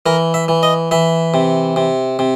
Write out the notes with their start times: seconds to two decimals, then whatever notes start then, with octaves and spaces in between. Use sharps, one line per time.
0.06 E3 A#4
0.34 E5
0.48 E3
0.63 D#5
0.91 E3 E5
1.34 C3
1.76 C3
2.19 C3